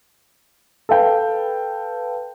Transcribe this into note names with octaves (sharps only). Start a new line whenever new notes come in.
A4 B4 F5 G5